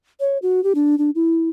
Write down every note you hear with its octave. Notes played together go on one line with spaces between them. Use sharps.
C#5
F#4
G4
D4
D4
E4